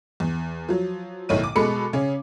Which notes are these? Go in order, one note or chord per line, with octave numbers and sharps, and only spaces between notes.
E2
F3 F#3
B1 A2 D#3 C#5 D#7
D6
B2 G#3 A4 B5 C#7
C#3 C#4